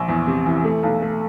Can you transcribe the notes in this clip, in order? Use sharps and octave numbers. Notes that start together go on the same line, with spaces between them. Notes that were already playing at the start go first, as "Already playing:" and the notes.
Already playing: A#1
E2
C3
E3
A3
B1
A3